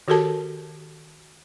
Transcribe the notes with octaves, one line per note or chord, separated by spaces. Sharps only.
D#3 F#4 G4 A4 A#4 A5